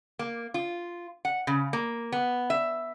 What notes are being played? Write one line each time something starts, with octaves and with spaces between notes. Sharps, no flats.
A#3
F4
F#5
C#3
A#3
B3
E5